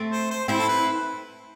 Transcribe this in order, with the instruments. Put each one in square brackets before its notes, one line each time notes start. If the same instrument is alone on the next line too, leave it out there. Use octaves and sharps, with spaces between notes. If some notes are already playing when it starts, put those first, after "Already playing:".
Already playing: [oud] A3 C4
[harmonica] C5
C5
[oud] C4 E4 [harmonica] C5
[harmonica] A4
B4